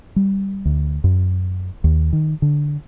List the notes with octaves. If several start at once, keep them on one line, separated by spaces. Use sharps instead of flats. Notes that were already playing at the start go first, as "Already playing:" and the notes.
G3
D2
F#2
D#2
D#3
D3